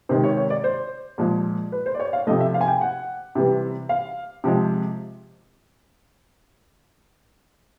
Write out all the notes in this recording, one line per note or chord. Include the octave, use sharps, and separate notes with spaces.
C3 D#3 G#3 C5
C#5
C#5
D5
C5
A#2 F3 G#3
B4
C5
D5
C#5
F5
C3 F3 A3 D#5
E5
F5
G#5
G5
F#5
C3 E3 G3
F5
C3 F3 G#3